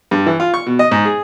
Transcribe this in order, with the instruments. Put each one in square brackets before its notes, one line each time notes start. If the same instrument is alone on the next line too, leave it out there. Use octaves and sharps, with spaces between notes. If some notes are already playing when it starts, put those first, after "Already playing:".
[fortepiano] G2
E3
F4
C#6
B2
D#5
G#2
G#4